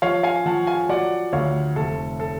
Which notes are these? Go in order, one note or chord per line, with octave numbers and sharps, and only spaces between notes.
F3 C#5 F5
F5 G#5
F3 F#5 A5
F5 G#5
F#3 D5 F#5
D2 C#5 F5
F1 A4
A4